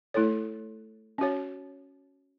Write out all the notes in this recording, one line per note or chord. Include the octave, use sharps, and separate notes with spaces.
A3 E4 A4 C#5
C#4 F#4 C#5